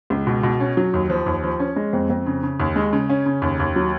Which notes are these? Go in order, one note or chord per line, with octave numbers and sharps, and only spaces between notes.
C#2
B2
B2
C#4
F#3
D#2
F3
D#2
F3
C#4
G#3
F2
F2
C#3
C#3
D#2
G#3
C#3
C#4
C#3
D#2
D#2
F#3